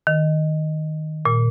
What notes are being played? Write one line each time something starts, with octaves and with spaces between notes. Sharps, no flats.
D#3
A#2